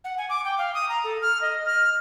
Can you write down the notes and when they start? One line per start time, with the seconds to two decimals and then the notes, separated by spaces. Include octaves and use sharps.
0.04 F#5
0.18 G#5
0.30 D6
0.45 G5
0.58 F5
0.74 D#6
0.89 A#5
1.04 A4
1.22 F6
1.41 D#5
1.66 F6